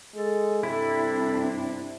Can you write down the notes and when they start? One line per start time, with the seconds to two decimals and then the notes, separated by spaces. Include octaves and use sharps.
0.14 G#3 A4
0.63 G2 C3 C4 D4 E4 A4